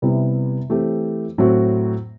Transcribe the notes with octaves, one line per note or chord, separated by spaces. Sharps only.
C3 G3 B3 E4
E3 A3 C4 G4
A2 F#3 A3 C4 F#4